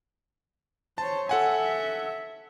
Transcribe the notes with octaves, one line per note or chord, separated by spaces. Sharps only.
C5 C#5 A5
A4 E5 F#5 G#5